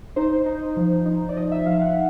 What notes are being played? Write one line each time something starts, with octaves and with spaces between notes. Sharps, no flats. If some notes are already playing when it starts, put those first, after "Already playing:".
D#4 C5
D#4
F3
D#4
D5
F3 D#5
E5
F3 F5
F#5